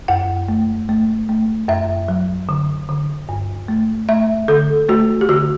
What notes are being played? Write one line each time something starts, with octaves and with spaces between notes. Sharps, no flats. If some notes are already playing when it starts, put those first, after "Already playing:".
F#2 F#5
A3
A3
A3
F#2 E5
F#3
D3
D3
G2
A3
A3 E5
D3 A4
A3 F#4
G4
D3 F#4